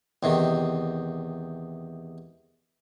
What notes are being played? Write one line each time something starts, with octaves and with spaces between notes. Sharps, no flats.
E2 C3 D#3